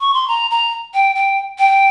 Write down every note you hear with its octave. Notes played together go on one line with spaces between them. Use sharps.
C#6
C6
A#5
A#5
G5
G5
G5